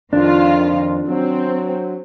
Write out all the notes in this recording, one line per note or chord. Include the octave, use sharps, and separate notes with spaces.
F2 D#3 D4 F4
F#3 C4